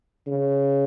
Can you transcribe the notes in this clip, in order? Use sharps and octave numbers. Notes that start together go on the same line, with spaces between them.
C#3